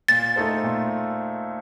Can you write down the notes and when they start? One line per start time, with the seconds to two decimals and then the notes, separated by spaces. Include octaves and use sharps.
0.08 A#2 A6
0.36 A3 D#4 A4 C5
0.64 A#2